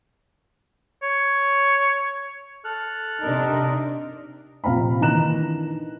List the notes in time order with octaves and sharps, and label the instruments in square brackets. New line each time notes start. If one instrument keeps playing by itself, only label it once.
[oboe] C#5
[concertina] A4 F6 F#6
[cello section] C3 D4 A#4 [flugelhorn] D#4
[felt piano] A#1 C3 F5 A#5 B5
D#3 E3 D4 A#5 F#6 E7